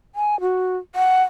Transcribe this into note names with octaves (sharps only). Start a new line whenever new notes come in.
G#5
F#4
F#5